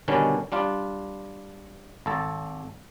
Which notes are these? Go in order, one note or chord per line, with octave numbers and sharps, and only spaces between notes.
B2 D3 D#3 G3 C#4 D4
G3 D4 F4
G#1 A4 A5